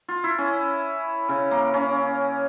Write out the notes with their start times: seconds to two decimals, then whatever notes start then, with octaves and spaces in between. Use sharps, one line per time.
0.09 F4
0.24 E4
0.38 C#4
1.29 C#3
1.51 A#3
1.74 C#4